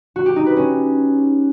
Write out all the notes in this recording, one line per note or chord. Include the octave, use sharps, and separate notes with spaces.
F#4
G4
D#4
B4
C#4